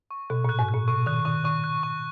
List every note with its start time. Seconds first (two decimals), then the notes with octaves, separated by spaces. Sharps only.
0.11 C#6
0.30 B2 F#6
0.45 A#2 F#6
0.59 G#2
0.69 A#2 F#6
0.88 B2 C#6
1.06 D#3 F#6
1.25 D#3 C#6
1.44 D#3 C#6
1.64 F#6
1.83 C#6